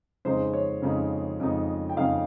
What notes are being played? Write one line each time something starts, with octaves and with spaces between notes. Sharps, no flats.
F2 C#3 G#3 D#4 C5
C#5
F2 C#3 G#3 D#4
F2 C#3 G#3 D#4
G5
F2 C#3 G#3 D#4 F5